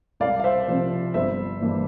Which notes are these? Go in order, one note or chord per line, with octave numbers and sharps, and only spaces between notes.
C2 D5 F5
F5
C5 E5
C3 F3 C5
G1 C5 E5
G2 E3 A#3